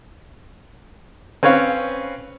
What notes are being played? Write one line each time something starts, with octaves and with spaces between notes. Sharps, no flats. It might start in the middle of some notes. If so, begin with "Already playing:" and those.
C4 C#4 B4 C#5 F5